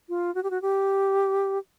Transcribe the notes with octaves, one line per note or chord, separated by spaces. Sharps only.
F4
F#4
G4
F#4
G4